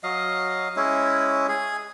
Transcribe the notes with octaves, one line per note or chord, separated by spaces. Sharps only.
F#3 D#5 F5
G#3 C#4 E4
G#4